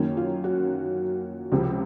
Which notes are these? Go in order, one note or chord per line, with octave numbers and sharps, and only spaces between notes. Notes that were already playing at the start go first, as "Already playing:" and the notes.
Already playing: F#2 D#3 A#3 C#4
F4
F#4
C#2 C3 F3 C4